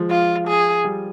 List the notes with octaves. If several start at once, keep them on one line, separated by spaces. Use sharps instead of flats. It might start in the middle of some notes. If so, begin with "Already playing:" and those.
Already playing: F3 G#3
F4
G#4
G3